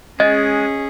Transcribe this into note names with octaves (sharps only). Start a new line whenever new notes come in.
G#3 C#4 G#4 D#5